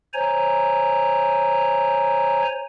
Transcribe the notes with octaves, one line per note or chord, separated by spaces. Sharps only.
C5 C#5 G#5 A#5